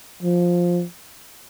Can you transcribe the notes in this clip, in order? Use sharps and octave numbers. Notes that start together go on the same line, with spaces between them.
F3